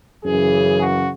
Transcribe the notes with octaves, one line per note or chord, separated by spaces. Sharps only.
F#2 C#3 E3 G#4
F#4